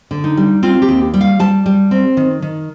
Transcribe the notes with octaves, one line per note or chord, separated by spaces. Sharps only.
D3
D#4
G3
C4 F4
G4
D#2
G3
F5
G3 A5
G3
C4
D#3
D#3